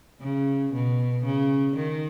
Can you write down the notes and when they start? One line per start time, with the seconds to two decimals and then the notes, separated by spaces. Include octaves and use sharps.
0.21 C#3
0.73 B2
1.25 C#3
1.76 D#3